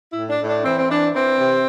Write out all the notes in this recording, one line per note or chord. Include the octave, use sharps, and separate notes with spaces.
E4
A2
D4
A2
D4
E3 C4
C4
E3 D4
E3 C4
C3